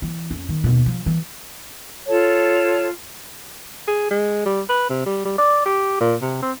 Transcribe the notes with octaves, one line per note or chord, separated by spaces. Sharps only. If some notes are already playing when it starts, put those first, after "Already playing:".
E3
F2 C#4
D#3
D#2 B2
F3
E3
F4 A4 C#5 A5
G#4
G#3
G3
B4
C3
G3
G3
D5
G4
A#2
C3
C4